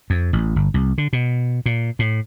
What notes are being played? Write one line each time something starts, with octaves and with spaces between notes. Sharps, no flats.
F2
A1
G1
C2
D3
B2
A#2
A2